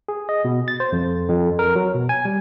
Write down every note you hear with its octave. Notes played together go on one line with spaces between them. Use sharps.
G#4
D#5
B2
A6
C5
F2
F2
A#4
F#3
B2
G#5
G3